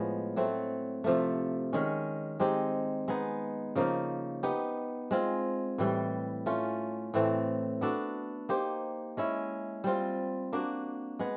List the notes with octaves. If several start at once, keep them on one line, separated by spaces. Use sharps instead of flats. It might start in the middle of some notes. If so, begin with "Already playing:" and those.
Already playing: A2 F3 G#3 B3
F#3 A3 C4
C3 F3 A3
D#3 G#3 C#4
G#3 C4 D#4 G4
G#3 B3 D#4
C#3 F3 A#3 D#4
B3 D#4 G4
G#3 C4 F4
A2 E3 G3
A3 C#4 F4
A2 E3 A3 C4
B3 D4 F#4 A4
A#3 D#4 G4 C5
G#3 C#4 E4
G3 C4 F4
A#3 D4 F#4
G#3 B3